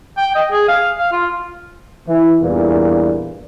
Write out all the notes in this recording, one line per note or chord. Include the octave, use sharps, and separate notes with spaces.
G5
D#5
G#4
F5
F5
F4
E3
E2 G2 A#2